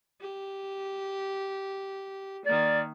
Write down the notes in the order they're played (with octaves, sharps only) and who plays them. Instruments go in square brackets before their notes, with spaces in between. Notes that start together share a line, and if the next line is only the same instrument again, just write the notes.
[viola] G4
[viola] D#3 A#3 [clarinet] D5